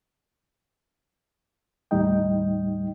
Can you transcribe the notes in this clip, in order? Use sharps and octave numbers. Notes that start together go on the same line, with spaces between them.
D#2 A2 G3 D#4 D#5 G5